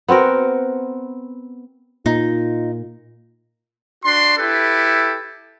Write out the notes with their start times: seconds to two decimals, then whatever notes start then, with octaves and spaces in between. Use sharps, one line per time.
0.08 B3 C4 F#4 A#4
2.06 A#2 D#4 F4
4.04 D4 F#4 C6
4.38 E4 G4 A4 B4